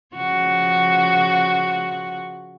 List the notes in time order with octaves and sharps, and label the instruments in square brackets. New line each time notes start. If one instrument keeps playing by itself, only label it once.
[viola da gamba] C#3 F3 F#4